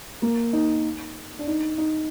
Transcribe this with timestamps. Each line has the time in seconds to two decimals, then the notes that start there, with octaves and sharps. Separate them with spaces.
0.22 A#3
0.53 D#4
1.39 D4
1.47 D#4
1.78 D#4